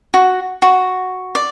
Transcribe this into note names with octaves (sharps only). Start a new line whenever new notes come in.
F#4
F#4
D5